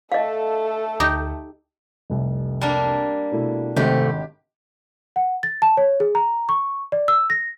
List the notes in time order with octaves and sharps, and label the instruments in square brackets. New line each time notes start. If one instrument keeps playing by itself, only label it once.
[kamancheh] A3 A4 [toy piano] D#5 F5
[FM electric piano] D2 [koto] D#4 G4
[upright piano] F1 C2
[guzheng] G3 A#3 D4
[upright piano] B2 A3 E4
[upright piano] G#1 [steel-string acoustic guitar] G#2 C3 A3 [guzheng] G4
[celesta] F#5
A6
A5
C#5
G#4
A#5
C#6
D5
E6
A#6